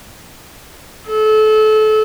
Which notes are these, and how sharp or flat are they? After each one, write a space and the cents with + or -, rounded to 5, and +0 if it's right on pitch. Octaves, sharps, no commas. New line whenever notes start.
A4 -30